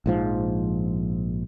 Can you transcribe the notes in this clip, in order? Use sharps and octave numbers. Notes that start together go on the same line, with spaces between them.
A#1 G#2 F3